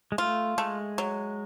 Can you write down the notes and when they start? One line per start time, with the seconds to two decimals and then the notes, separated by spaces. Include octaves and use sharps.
0.12 G#3
0.18 A3 F4
0.58 G#3 A3
0.98 F#3